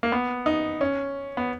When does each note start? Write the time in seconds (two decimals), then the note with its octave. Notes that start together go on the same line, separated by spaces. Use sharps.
0.03 A#3
0.12 B3
0.46 D#4
0.81 C#4
1.37 B3